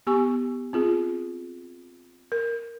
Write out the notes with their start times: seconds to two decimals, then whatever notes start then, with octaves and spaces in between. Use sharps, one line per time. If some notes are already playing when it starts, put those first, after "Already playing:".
0.07 B3 G4 G#5 C#6
0.73 C4 F4 G#4
2.32 A#4